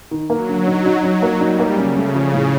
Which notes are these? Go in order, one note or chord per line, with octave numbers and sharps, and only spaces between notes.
D#3
F#3 A#3
D3
D#4
D#4
F#3 D#4
A#3
G3 D#4
A#3
C#3 C#4
A3
F3
A2